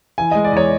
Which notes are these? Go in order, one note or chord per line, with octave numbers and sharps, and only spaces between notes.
E3 G#5
G#3 D#5
D5
E2 C#5